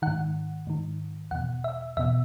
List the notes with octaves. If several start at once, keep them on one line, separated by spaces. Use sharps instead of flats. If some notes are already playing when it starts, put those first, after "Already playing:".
G#2 D#3 F#5
G#2 D#3
E2 B2 F#5
E5
E2 B2 E5